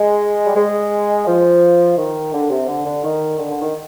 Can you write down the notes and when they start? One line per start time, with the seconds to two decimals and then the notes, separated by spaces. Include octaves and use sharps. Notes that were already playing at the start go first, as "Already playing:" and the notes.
Already playing: G#3
0.47 G3
0.56 G#3
1.27 F3
1.97 D#3
2.33 D3
2.50 C3
2.68 D3
2.85 D3
3.04 D#3
3.39 D3
3.50 D3
3.62 D#3